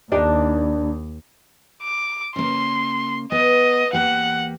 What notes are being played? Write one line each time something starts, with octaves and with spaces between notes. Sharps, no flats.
D#2 D4 D#4 G4
D6
C#3 A#3 C6
B3 D#5
E2 A#3 G4 F#5